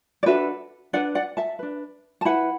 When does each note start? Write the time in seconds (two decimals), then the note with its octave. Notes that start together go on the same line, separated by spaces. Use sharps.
0.23 D5
0.26 D4 F#4 A4 B4 E5
0.93 D4 B4 D5 F#5
1.15 D5 F#5
1.37 E5 A5
1.59 D4 B4
2.21 A5
2.25 E4 B4 F#5 B5